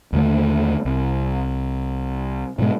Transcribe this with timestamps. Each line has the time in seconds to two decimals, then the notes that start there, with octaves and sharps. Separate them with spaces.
0.13 D#2 D3 A3
0.85 C2
2.59 G#2 B2 G#3